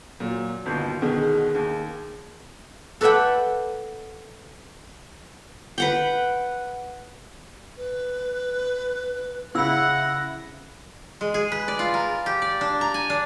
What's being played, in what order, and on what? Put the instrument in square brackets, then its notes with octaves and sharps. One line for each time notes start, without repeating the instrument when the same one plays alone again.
[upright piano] A#2 [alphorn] F#3
[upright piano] G1 D#2 [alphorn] B2
[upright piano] B2 D3 D#3 [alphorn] G#4
[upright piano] D#2
[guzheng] A4 B4 D5 E5 F#5 G5
[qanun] B4 F#5 G5
[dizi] B4
[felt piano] C#3 [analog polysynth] E4 A#6 [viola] F#5
[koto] G#3
G#4
B4
D5
F4
A#4
G4
D5
D4
A#5
G#5
D4